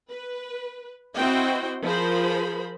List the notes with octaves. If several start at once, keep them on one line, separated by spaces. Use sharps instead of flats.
B4
C4 E4 F#4 C5 D#5 G5
F3 G#4 A#4 C5 B5